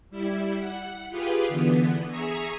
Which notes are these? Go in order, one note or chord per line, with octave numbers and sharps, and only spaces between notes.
G3 E4
F#5
F4 G4 G#4 B4
D3 E3 B3
G#4 E5 A#5 C#6